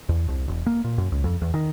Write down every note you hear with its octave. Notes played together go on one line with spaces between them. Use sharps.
E2
C2
E1
A#3
A#2
F#2
C#2
F2
E2
D#3